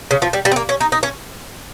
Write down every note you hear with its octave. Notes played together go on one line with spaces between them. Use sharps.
C#3
F3
G3
G3
C4
A#3
C#4
D#4
D#4
C#4